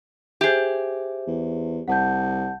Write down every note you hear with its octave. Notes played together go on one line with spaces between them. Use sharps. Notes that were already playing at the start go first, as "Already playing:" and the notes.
G4 G#4 C5 E5
E2
C2 F#5 A5 G6